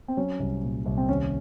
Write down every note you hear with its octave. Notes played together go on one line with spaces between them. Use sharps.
C4
F#3 C#4
C2
A#2
C2
C4
D#2 C#4